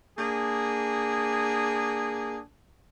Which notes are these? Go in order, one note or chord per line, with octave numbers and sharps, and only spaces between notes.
A#3 D4 G#4